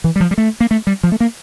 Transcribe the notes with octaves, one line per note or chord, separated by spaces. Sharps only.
E3
G3
F3
G3
A3
A#3
A3
G3
F3
A3
A#3